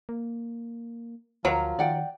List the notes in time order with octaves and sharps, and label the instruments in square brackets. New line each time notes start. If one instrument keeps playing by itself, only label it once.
[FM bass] A#3
[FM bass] D2 [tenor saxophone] F3 [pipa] F#3 [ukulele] A#4 A#5
[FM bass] D#3 [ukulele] D5 F#5 G5